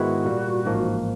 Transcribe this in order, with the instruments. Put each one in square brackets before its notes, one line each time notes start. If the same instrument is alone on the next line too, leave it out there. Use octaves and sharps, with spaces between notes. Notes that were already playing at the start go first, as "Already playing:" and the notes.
Already playing: [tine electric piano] G#2 D#3 G#3 B3 E4 [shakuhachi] F#4
[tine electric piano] A#2 G3 A#3
A1 G#2 F3 A#3 D#4